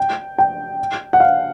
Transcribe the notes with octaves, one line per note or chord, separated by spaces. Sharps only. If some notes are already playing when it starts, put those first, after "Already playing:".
Already playing: G5
G5
F#5
F5